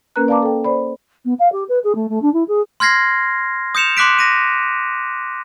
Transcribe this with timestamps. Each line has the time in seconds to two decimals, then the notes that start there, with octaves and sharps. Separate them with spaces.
0.16 A#3 C#4 A#4 B4 A#5 F#6
0.28 D5 F5 A5 A#5 D6
0.43 A4 G5
0.64 C5 D5 B5
1.25 B3
1.39 F5
1.52 G4
1.69 B4
1.84 G#4
1.95 A3
2.09 A3
2.22 D4
2.33 E4
2.48 G#4
2.80 C6 F6 G#6 A#6 C7
3.75 D#6 G6 C#7 E7 F7
3.97 C6 D6 F#6 B6 D7
4.19 A#6 D#7